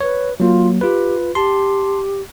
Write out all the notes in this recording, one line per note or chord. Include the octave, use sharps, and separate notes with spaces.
B4 C#5
F#3 A#3 F4
F4 G4 B4
G4 A5 C6